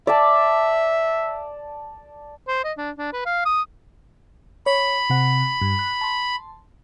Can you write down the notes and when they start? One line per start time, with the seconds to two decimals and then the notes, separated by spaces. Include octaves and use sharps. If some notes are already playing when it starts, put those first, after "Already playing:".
0.07 D5 E5 A5
2.48 C5
2.64 D#5
2.78 D4
2.98 D4
3.13 B4
3.26 F5
3.46 D#6
4.66 C#5 B5
5.10 C3 F#5
5.61 G2
5.79 F#6
6.01 A5 C6